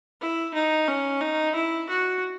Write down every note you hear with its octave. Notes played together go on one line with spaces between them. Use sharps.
E4
D#4
C#4
D#4
E4
F#4